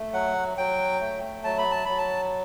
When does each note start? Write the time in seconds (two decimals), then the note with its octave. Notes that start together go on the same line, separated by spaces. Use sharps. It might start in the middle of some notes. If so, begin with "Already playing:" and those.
Already playing: A3
0.13 F#3 F#5
0.57 F#3 G5
1.00 A3
1.44 F#3 A5
1.58 B5
1.71 A5
1.85 F#3 B5
1.98 A5